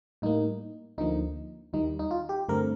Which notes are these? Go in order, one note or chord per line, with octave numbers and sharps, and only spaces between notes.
A2 G3 A#3 D#4
D2 D3 F3 A#3 D#4
D#2 D#3 G3 D#4
D#4
F4
G4
G2 D3 A3 C4 A#4